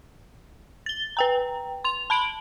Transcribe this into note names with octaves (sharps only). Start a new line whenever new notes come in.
A6 G7
B4 G5 A#5
C6 F7
A5 B5 D7 F#7